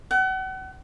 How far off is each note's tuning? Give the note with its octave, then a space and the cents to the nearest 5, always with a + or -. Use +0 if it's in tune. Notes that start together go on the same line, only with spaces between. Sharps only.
F#5 +35